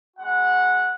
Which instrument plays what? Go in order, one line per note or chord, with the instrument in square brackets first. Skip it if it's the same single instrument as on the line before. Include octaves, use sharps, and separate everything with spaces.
[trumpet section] G#3 B3 F#4 F#5